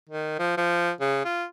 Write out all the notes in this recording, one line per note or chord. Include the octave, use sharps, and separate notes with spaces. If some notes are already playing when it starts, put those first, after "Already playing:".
D#3
F3
F3
C#3
F4